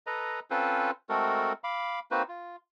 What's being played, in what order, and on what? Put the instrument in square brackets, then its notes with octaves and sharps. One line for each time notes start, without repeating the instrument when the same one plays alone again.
[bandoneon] A4 B4 D#5 A#5
C4 C#4 F4 A4 B4 C5
G#3 A3 C4 F#4 A4 A#4
F5 B5 D6
A#3 C4 D#4 F#4 B4 C5
F4